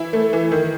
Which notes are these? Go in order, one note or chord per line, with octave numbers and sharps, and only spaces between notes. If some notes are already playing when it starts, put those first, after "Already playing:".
Already playing: E3 E4
A3
E3
D#3